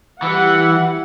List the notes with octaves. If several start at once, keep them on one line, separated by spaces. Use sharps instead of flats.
E3 G3 F#5